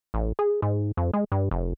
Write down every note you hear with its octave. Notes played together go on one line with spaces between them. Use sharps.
A1
G#4
G#2
F2
G#3
G2
F1